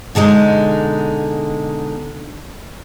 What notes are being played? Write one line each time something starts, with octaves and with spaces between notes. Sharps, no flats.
B2 D3 G#3 D#4